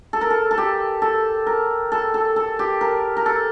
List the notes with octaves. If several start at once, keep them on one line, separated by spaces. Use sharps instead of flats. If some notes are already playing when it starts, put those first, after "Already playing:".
A4
A#4
A4
A4
G4
A4
A#4
A4
A4
A4
G4
A#4
A#4
A4